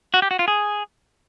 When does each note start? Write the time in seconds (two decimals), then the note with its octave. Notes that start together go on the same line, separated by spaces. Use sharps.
0.14 F#4
0.22 G4
0.31 F#4
0.39 F4
0.48 G#4